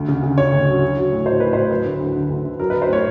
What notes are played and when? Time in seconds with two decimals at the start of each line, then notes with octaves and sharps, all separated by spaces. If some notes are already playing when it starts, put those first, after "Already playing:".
Already playing: D2
0.08 C#3
0.23 C#3
0.38 C#3 C#5
0.52 D2
0.68 F#3
0.82 F#3
0.97 F#3
1.12 A2
1.26 F#3 C5
1.40 A2 B4
1.53 A2 C5
1.71 F#3 B4
1.85 D2
2.00 D2
2.16 D3
2.30 D2
2.45 D2
2.60 F#3 A#4
2.70 F#3 B4
2.82 C5
2.89 A2 C#5